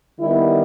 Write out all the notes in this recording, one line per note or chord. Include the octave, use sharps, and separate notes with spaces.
D#3 G3 B3 E4